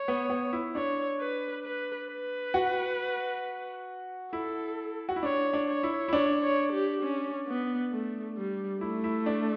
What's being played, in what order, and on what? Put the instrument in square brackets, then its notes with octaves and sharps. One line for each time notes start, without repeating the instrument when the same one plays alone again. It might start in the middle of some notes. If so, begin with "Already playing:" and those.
Already playing: [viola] C#5
[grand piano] B3
B3
E4
[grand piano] D4 [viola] C#5
[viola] B4
B4
B4
[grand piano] F#4
[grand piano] E4 [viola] A4
[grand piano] F#4
E4
[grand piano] D4 [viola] C#5
[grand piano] D4
[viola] C#5
[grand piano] E4
E4
[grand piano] D4 [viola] C#5
[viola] C#5
G4
C#4
B3
A3
G3
[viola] A3 [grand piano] E4
[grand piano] E4
D4